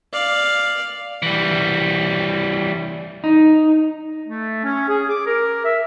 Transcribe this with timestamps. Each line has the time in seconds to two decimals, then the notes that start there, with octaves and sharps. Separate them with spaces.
0.13 D5 F5
1.22 E3 G3
3.24 D#4
4.27 A3
4.63 C#4
4.88 G#4
5.09 D6
5.26 A#4
5.64 E5